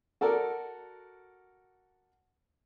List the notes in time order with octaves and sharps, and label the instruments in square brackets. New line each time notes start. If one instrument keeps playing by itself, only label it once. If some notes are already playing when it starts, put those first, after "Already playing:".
[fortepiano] F#4 A4 A#4 D5